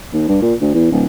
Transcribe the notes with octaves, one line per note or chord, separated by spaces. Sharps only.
D#2
G2
A#2
D2
E2
D1